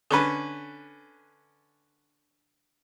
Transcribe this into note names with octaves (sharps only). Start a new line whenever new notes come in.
D3 C#4 B4